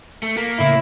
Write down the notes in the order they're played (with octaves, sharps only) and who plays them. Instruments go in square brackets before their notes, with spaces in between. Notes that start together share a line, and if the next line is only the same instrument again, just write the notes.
[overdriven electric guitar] A3
[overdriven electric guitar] A#3 [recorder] B6
[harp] A2 C#3 A3 [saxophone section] E4